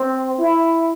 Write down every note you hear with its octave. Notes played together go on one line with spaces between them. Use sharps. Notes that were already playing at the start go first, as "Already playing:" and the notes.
Already playing: C4
E4